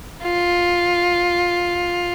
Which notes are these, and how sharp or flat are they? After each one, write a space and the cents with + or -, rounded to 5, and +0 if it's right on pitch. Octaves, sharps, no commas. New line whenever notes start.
F4 +10